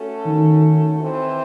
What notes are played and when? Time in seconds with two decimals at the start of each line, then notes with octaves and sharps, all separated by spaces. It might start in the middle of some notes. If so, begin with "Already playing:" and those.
Already playing: A3 C#4 F#4 A4
0.26 D#3
0.99 E3 C4 E4 C5 D#5